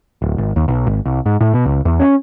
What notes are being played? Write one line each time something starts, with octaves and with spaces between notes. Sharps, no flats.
D1
G#1
D#2
B1
G#1
C2
G#2
A2
B2
C#2
E2
C#4